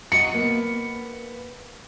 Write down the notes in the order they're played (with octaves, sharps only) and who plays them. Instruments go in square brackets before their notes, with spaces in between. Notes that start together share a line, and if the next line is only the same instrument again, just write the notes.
[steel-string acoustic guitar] F#3 F#4 D#5 [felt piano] C#7
[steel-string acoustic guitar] A#3 B3